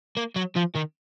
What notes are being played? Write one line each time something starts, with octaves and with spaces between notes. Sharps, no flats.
A#3
F#3
F3
D#3